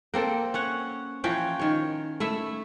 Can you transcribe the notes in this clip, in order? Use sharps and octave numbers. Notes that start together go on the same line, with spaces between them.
A#3 C4 A4
C#4 C#5 F#5
E3 F3 C#4 G5
D#3 C#5
A3 E4 E5